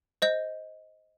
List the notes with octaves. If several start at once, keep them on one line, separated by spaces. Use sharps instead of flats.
C5 D#5 G6